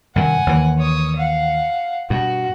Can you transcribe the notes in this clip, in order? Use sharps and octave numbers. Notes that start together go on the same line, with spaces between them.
G2 C3 D#3 F#5 G#5
D#2 E3
C#5 D#6
F5 F#5
G2 B2 F#4